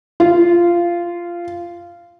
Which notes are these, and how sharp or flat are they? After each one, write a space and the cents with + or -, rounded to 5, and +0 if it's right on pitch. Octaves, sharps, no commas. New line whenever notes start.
F4 -15